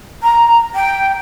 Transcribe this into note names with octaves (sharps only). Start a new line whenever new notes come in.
A#5
G5